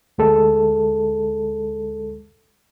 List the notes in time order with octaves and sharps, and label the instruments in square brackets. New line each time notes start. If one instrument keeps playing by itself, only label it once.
[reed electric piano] D2 G#3 A4